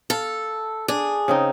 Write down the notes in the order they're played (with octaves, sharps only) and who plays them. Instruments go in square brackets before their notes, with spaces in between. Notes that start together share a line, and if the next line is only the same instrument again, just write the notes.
[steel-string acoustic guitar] A4 [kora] F5
[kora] D4 [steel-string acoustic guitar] G#4
[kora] C#3 C4 D#4